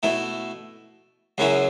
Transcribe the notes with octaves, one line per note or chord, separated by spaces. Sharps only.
B2 A3 E4
F#2 C#3 F#3 C#4 E4